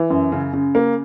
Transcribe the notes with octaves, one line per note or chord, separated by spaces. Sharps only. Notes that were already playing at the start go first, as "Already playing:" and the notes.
Already playing: E3
F#2
C#3
C#3
A#3